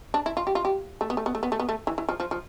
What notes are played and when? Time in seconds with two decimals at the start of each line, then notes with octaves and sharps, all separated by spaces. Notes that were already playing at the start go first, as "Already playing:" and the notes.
0.14 D4
0.26 E4
0.37 F4
0.47 G4
0.55 F4
0.65 G4
1.01 A3
1.10 B3
1.17 A3
1.26 B3
1.35 A3
1.43 B3
1.52 A3
1.60 B3
1.69 A3
1.87 E3
1.98 E3
2.09 F3
2.20 F3
2.31 F3